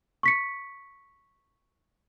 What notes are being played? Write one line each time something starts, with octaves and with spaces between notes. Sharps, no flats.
C#6 B6 C#7